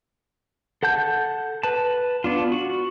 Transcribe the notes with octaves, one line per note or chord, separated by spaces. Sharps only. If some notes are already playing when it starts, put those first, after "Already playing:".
A4 F#5 A5 G6
B4 A5
B3 D4 F4
F#4